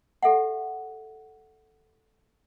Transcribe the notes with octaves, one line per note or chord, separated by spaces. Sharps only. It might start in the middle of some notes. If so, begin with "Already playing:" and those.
G4 A4 E5 F#5